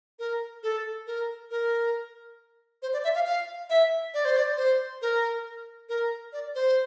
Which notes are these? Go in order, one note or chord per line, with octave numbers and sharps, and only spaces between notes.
A#4
A4
A#4
A#4
C5
D5
E5
F5
F5
E5
D5
C5
D5
C5
A#4
A#4
D5
C5